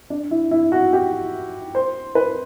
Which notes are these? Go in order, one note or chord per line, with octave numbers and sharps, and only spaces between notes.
D4
E4
E4
F#4
G4
C5
B4